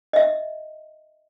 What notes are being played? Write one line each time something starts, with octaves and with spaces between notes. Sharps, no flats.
D#5 E5